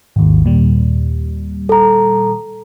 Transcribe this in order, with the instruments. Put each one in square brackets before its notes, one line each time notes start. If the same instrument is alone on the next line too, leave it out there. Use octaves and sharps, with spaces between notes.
[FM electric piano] G#1 D#2
D#2 A#2 G3
[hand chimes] A4 A#5